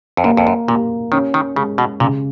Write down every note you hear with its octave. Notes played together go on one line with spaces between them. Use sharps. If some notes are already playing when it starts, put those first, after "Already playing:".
F2
F#2 A#3
F2
F#2
A#2 A#3
D#3 C#4
D#3
C#3 G#3
B2
A#2 C#3